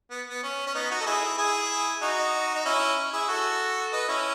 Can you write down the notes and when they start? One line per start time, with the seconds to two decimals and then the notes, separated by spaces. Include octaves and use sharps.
0.11 B3
0.30 B3
0.43 C#4
0.67 C#4
0.75 B3 D#4
0.91 D#4 F#4
1.01 A4
1.06 E4 G#4
1.37 E4 G#4
2.02 D#4 F#4
2.55 D#4
2.65 C#4 E4
3.13 E4 G#4
3.28 F#4 A4
3.92 B4 D#5
4.08 C#4 E4